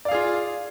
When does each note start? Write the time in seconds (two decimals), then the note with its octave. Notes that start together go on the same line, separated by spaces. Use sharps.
0.05 D5
0.08 F5
0.11 G#4
0.15 F4